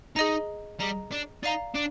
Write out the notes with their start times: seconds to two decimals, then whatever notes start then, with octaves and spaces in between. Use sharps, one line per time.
0.16 D#4 G#4 D#5 A#5
0.80 G3 G#4 D#5 A#5
1.12 D4
1.43 D#4 D5 F5 A#5
1.75 D4